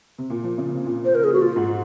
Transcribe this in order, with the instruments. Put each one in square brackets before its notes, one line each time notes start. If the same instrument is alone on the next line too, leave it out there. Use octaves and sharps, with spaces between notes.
[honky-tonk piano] C3
A#2
F3
C#3
C3
A#2
[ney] C5
A#4
G#4
F#4
F4
[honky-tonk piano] G#2